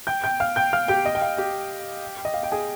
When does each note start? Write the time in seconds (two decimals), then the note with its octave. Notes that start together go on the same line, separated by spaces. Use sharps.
0.07 G5 G6
0.24 G5 G6
0.40 F5 F6
0.56 G5 G6
0.73 F5 F6
0.88 G4 G5
1.05 D#5
1.15 G5
1.22 F5
1.38 G4 G5
2.25 D#5
2.34 F5
2.43 G5
2.52 G#4 G#5